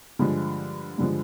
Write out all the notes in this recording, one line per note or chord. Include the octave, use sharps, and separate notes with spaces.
G2 D3 F3 G#3
G2 D3 F3 G#3